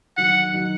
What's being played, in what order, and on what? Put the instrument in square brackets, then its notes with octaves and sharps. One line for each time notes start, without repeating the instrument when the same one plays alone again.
[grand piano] D#3 F#3 D#4 F#4 [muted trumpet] F#5
[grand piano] D#3 F#3 D#4 F#4